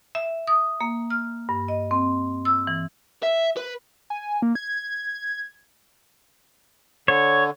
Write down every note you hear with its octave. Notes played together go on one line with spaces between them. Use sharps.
E5
D#6
A#3
F6
G2
D#5
C4
E6
E3
E5
B4
G#5
A#3
G#6
D3 C#5